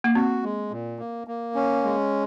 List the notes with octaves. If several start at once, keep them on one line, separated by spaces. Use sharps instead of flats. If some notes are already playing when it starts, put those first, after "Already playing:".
A#3
C4 F#4
G#3
A#2
A#3
A#3
C#4
G#3